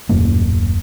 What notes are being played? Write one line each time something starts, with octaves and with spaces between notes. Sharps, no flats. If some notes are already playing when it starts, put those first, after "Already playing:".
D#1 F#2 A2 A#3